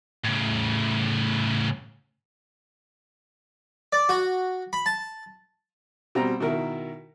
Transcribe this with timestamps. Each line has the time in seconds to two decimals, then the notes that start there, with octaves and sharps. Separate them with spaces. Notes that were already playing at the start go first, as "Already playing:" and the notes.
0.25 A2 C#3
3.93 D5
4.09 F#4
4.73 B5
4.86 A5
6.15 B2 G3 C4 A#5
6.40 B2 D#3 E4 A#4